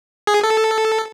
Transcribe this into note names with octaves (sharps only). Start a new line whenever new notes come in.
G#4
A4